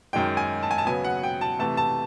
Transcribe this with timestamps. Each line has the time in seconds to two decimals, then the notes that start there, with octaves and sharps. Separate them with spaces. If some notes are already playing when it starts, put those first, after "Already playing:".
0.13 F#2 D#3 G#3 G5
0.37 G#5
0.63 A5
0.71 G#5
0.78 A5
0.86 C#3 F#3 B3 G#5
1.05 F#5
1.23 G5
1.41 A5
1.59 C3 E3 A3 A5
1.77 A5